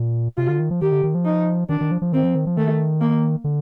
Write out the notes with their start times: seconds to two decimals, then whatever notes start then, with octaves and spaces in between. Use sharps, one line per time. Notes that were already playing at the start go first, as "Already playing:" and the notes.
Already playing: A#2
0.37 C3 F4
0.49 D3
0.59 D#3
0.71 F3
0.82 D#3 G4
0.92 D3
1.03 D#3
1.15 F3
1.25 D#4
1.69 D#3 D4
1.81 D#3
1.91 F3
2.02 F3
2.12 D#3 C4
2.24 F3
2.35 D#3
2.47 F3
2.57 D#3 A3
3.01 A#3
3.44 D3